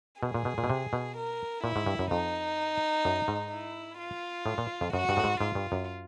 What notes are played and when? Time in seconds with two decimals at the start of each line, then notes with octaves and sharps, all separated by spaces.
0.22 B2 G#4
0.34 A#2
0.45 B2
0.58 A#2
0.64 B2
0.70 C3
0.93 B2
1.17 A#4
1.64 A#2 E4
1.76 G#2
1.86 G2
1.99 F#2
2.11 F2 D#4
3.05 F#2
3.28 G#2
3.51 E4
3.99 F4
4.46 A2
4.58 A#2
4.81 F2
4.93 F#2 F#4
5.09 G2
5.17 A2
5.24 G#2
5.40 G#2 F4
5.55 G2
5.72 F#2